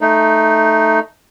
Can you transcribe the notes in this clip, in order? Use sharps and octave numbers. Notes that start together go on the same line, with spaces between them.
A3 D#4